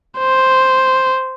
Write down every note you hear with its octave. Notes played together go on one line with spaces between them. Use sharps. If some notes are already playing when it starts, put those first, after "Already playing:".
C5